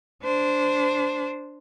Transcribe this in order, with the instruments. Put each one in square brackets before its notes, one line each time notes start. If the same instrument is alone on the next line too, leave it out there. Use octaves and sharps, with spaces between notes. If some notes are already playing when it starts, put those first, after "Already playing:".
[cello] D4 C5